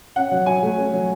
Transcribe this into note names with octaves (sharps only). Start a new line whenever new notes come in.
C#4 F#5
F#3
F#3 G#5
A3
C#4
F#3